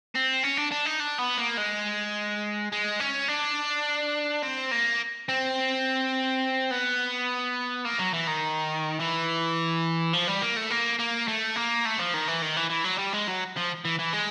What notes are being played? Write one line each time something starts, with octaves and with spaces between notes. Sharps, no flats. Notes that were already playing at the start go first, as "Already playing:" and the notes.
C4
C#4
D4
D4
D#4
D4
B3
A#3
G#3
G#3
C#4
D4
C4
A#3
C4
B3
A#3
F#3
E3
D#3
E3
F3
G3
A#3
A3
A#3
A#3
A3
A#3
A3
F3
D#3
E3
D#3
E3
E3
F#3
G3
G#3
F#3
F3
E3
E3
G#3